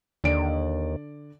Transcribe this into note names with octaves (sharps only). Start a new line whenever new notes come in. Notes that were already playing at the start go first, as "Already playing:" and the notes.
D#2 D3 D5 D7